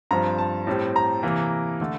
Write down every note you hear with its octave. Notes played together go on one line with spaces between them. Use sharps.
G2 F3 C4 A#5
A5
A2 G3 C4
A#5
C3 E3 A#3
D3 A3